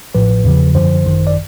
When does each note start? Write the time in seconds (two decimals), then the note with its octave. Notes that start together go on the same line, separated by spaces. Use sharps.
0.14 A1 A2 F3 B4
0.44 E2 C#3 F3
0.75 F#2 D3 F3 C5
1.05 G#1 F#2 D#3
1.27 D5